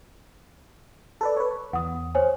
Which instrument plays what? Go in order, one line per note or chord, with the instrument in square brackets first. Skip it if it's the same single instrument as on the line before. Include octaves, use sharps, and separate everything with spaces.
[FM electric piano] A4 B4 D5
B4 C#5
[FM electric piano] E2 [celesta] F#5 D#6
[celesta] C5 C#5 G#5